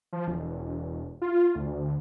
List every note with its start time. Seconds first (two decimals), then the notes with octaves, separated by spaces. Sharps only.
0.13 F3
0.28 E1
1.22 F4
1.55 D2